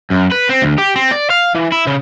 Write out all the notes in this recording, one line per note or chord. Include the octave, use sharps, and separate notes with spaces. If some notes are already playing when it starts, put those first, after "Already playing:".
F#2
B4
C4
D2
G4
C4
D5
F5
E3
E4
C#3